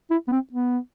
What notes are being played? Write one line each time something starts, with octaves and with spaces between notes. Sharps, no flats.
E4
B3
C4
B3